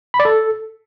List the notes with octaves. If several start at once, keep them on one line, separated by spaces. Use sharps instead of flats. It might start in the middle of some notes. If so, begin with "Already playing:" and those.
B5
D5
A4